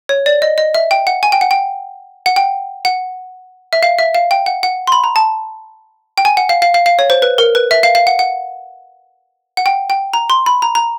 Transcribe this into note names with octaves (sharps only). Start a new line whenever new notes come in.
C#5
D5
D#5
D#5
E5
G5
F#5
G#5
G5
F#5
G5
F#5
G5
F#5
E5
F5
E5
F5
G5
F#5
F#5
C6
B5
A#5
A5
G5
G#5
F#5
F5
F5
F5
F5
C#5
C5
B4
A#4
B4
E5
F5
F5
F#5
F#5
F#5
G5
G5
A#5
C6
B5
A#5
A#5